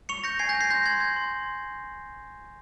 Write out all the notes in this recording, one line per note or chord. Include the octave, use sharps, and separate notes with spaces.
C#6 C#7 F7
G6 A#6 C#7
G#5 G#6 C7
G6 A#6
G#5
G#6 C7
C6 G6 A#6
C6 G#6
G6 G#6
C6